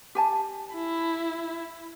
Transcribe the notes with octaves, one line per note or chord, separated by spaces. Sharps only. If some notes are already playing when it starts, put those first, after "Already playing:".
G4 G#5 A5
E4